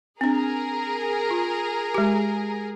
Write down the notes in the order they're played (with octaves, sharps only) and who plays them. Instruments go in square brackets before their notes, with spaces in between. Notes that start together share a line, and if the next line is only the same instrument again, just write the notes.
[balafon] C4 D4 [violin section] G#4 A#4
[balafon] F4
G#3 G4